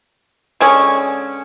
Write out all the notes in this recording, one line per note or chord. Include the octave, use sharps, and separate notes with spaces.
D3 G#3 C#4